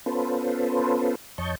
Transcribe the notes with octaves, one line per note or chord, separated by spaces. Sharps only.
B3 C#4 F4 A4 B4 C5
F2 C#5 D#5 A5 C#6 G6